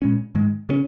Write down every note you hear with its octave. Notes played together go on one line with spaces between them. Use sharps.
A#2 G#3 C#4
G#2 D#3 G#3
C#3 G#3 C#4